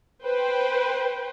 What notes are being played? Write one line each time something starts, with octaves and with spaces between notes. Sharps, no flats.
B4 C5 G5